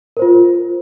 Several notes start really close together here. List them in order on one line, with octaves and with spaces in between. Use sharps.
A#4 C5 F4